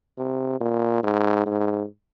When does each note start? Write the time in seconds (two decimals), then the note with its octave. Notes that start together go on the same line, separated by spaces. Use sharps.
0.18 C3
0.60 A#2
1.03 G#2
1.46 G#2